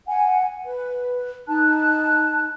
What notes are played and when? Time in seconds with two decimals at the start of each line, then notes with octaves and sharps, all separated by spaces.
0.08 F#5 G#5
0.65 B4
1.47 D#4 A5 F#6